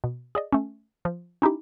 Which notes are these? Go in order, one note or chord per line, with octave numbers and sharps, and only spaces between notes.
B2
G#4 D5 D#5
A3 C#4
F3
C#4 D#4 E4 G4